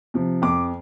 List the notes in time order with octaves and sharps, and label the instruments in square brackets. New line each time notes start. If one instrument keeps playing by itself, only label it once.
[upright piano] C3 F3
F2 D6